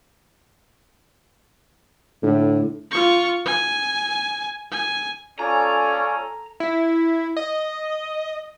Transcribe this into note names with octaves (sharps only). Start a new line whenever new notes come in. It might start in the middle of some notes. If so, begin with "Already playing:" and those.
A2 D3
F4 C#6
G#5
G#5
C#4 F4 A4 D5 G#5 A#5
E4
D#5